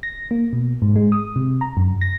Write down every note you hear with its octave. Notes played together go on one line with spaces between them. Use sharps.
A#6
A#3
B2
G#2
G#3
D#6
C3
A#5
F#2
A#6